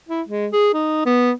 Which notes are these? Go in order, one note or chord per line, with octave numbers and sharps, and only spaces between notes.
E4
G#3
G#4
D#4
B3